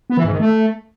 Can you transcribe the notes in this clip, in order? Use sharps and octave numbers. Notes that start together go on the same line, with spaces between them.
B3
E3
G#2
D#3
A3